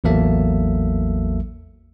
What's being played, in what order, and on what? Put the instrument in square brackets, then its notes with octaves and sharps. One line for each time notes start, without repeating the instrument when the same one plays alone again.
[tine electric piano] A1 E2 F#3 A#3 A4 E5